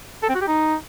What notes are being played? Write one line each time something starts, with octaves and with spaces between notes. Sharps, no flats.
A4
C4
F#4
G4
D#4